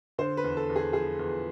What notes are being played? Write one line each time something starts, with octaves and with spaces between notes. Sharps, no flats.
D3 C5
B4
E2
A4
E2
G#4
F3 G#4
E2